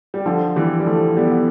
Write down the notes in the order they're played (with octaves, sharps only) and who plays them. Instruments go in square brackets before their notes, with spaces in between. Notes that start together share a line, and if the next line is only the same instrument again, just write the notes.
[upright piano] G3
D3 F3
E3 G3
G3
F3 A3
G3 B3
B3